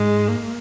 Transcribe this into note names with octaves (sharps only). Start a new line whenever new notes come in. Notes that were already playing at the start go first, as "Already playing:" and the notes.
Already playing: G#2 G#3
A#3